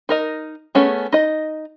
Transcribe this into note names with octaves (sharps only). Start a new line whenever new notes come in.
D#4 A#4 D#5
A3 B3 C#4 G#4
D#4 D#5